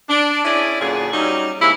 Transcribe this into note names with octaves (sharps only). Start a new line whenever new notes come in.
D4
C#4 E4 G#4 D5
D2 A#2 F#3 C#4 G#4
F#3 G3 C#4 D#4
G#2 C3 G#3 A#3 E4